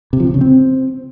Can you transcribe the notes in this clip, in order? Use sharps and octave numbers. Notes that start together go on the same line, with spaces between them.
C3
F3
C3
C#3
C4